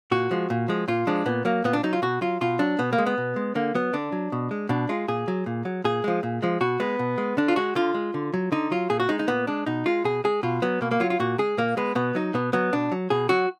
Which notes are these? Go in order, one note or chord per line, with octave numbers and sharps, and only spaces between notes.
A#2 F#4
F3 G#3
A#2
F3 G#3
A#2 F4
F3 G#3 D4
A#2 B3
F#3 A#3
A#2 B3
D4
F#3 D#4
F4
B2 F#4
F#3 F4
B2 F4
F#3 D4
B2 B3
A#3
G#3
B3
B2
G#3
D3 A#3
F#3 B3
D3 D4
F#3
B2
G#3
B2 D4
G#3 F4
A#2 G#4
F#3
A#2
F#3
A#2 G#4
F3 G#3
A#2
F3 G#3
B2 F#4
G#3 B3
B2
G#3
D3 D4
F4
G#3 F#4
D3 F4
G#3
D3
F#3
D3 D#4
F#3 F4
A#2 G#4
F#4
G#3 D#4
D#4
A#2 B3
G#3 D4
B2 D#4
G#3 F4
B2 G#4
G#3 G#4
B2 F4
F#3 B3
B2 A#3
A#3
F#3 F4
F4
A#2 F#4
G#3 G#4
A#2 A#3
G#3 B3
B2 B3
F#3 D#4
B2 B3
F#3 B3
B2 D4
F#3
B2 G#4
F#3 F#4